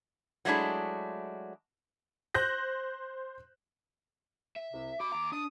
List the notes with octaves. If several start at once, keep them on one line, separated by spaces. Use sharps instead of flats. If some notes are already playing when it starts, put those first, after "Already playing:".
F#3 G#3 A3 D4 E4 G#4
C5 F#6 G6 A#6
E5
C2 C3
F#4 B5 D6
D#2 A#5
D4 D#6